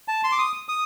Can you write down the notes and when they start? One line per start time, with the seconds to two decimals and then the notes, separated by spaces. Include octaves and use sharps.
0.08 A5
0.24 C6
0.32 D6
0.39 D#6
0.69 D#6